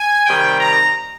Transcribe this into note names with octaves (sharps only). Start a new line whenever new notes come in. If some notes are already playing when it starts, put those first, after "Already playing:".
Already playing: G#5
C3 D#3 G3 G5
A#5